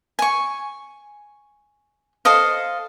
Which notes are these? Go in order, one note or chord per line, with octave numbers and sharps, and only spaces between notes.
G#5 C#6
A4 C5 D#5 F5